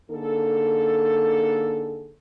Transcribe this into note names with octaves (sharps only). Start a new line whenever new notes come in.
D3 A#3 D#4 G#4 A4